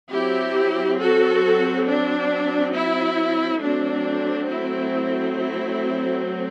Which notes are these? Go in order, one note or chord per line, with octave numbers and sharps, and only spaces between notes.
F#3 C4 E4 G4
F#4 A4
D4
E4
F#3 A3 C4 D4
E4
E4